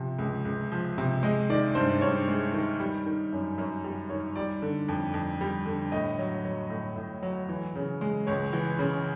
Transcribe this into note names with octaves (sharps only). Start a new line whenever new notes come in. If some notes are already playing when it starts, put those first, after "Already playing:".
Already playing: C3 F3
C#2
C#2
F3
C3
G#3 D#5
D#3 D5
G2 C5
G2 C#5
G#3
D#3
G3
D#3
F#2
F#2 C#5
G3
D#3 C#5
G3 D5
D3
F2
F2
G3
D3
A2 D#5
F#3
F#3
A2
A2
F#3
E3
C#3
G#3
C#2 C#5
E3
C#3